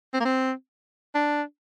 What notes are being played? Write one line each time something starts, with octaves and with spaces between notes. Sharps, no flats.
C4
A#3
C4
D4